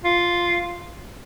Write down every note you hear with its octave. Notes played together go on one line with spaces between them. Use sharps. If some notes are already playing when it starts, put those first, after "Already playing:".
F4